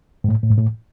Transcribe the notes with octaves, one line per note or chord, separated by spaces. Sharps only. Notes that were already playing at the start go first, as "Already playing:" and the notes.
G#2
A2
A2
G#2
A2